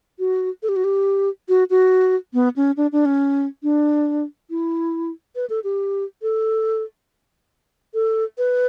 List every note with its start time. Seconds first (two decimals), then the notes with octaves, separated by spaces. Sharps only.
0.19 F#4
0.63 A4
0.69 G4
0.76 F#4
0.84 G4
1.49 F#4
1.70 F#4
2.34 B3
2.56 C#4
2.77 D4
2.92 D4
3.06 C#4
3.63 D4
4.50 E4
5.36 B4
5.50 A4
5.64 G4
6.22 A4
7.94 A4
8.38 B4